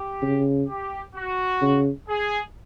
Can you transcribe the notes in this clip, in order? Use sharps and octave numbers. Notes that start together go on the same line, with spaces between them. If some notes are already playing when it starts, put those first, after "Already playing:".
Already playing: G4
C#3
G4
F#4
C#3
G#4